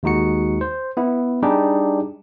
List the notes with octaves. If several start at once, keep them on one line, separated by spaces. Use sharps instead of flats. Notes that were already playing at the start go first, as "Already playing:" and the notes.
D#2 G#3 D#4 F#4 C#7
C5
B3 E4
G3 D4 D#4 G4 G#4